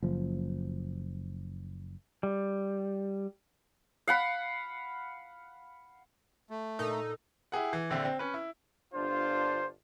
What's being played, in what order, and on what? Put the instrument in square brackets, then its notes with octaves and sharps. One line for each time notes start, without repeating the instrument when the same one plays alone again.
[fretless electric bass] F#1 F3
[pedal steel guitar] G3
[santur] F5 F#5 B5
[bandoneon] A3
[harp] A#2 [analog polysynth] D#4 [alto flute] A4
[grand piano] E4 G4 G#4 F#5
E3
A#1 D3 C4 E5
C4
C#4 B4
E4
[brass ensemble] G1 D4 F4 [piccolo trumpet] C5